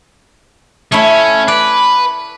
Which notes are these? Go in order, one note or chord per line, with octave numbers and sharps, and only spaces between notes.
A3 C#4 E4
B4 D5